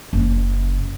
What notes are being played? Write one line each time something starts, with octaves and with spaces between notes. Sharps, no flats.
F#1